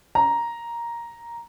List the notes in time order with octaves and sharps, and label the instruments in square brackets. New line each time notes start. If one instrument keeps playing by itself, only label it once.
[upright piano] A#5